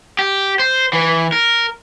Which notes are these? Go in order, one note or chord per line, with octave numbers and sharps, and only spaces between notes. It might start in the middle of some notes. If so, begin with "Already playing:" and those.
G4
C5
E3
A#4